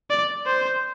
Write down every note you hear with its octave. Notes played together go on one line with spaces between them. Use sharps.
D5
C5